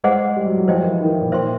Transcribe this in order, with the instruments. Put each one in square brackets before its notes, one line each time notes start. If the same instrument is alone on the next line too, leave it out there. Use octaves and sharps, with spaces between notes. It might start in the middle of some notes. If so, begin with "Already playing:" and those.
[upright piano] G#3 [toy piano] G#4 C5 D#5 F#5
[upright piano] G3
F#3
F#3
[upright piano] F3 [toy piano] C5 D#5 G5
[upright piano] E3
D#3
E3
A#2
[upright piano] A#2 [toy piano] C5 E5 G5 C6